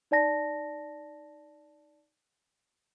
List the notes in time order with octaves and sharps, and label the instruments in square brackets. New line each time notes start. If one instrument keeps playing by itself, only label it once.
[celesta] D#4 D5 A5 A#6